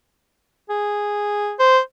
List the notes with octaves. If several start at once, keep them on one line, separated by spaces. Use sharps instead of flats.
G#4
C5